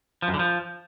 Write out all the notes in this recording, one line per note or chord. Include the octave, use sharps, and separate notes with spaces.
F3
F#2
D3
F3